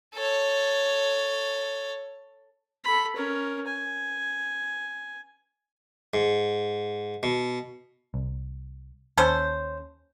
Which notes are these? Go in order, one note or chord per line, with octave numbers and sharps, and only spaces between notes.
A4 C#5
A4 B5
C#4 A#4
G#5
G#2
B2
C2
D#2 C#4 A4 C5